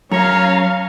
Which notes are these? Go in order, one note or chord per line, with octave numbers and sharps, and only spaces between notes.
F#2 C#4 C#5 F5 A#5